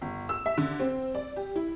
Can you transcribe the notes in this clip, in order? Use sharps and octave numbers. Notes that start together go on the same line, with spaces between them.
G1
E6
E5
D3
C4
D5
G4
E4